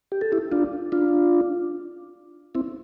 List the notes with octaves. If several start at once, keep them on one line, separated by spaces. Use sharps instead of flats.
G4
A4
E4 G4
D4 F4
D4 F4
C4 E4